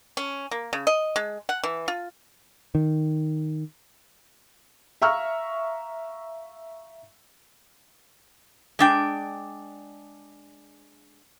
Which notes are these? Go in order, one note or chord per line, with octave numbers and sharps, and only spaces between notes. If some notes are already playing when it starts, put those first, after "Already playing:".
C#4
A#3
C#3
D#5
G#3
F#5
E3
F4
D#3
E5 F5 A#5 C#6 E6 F6
G#3 D4 G5